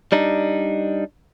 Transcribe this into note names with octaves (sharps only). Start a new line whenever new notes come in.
G3 D4 D#4